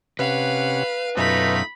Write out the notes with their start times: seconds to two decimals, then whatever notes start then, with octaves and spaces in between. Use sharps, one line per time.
0.19 C3 C#4 B4 F5 F#5
1.17 F#2 B2 A3 D#4 F4 B5